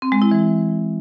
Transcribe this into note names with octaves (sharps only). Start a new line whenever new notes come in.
C4
G#3
E4
E3